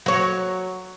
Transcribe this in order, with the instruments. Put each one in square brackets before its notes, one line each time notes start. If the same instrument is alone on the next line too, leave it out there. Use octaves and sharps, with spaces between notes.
[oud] F#3 C#5